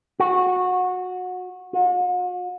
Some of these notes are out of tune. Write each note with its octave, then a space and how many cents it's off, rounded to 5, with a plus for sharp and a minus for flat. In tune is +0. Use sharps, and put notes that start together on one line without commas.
F#4 -20
F#4 -45